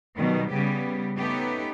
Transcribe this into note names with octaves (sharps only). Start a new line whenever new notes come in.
B2 D#3 F#3 G3
C#3 G3 B3 G4
A3 B3 C#4 D#4 G4 B4